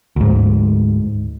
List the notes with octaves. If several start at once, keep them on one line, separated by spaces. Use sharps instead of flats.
D2 G#2